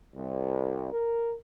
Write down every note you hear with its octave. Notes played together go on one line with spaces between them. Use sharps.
C2
A#4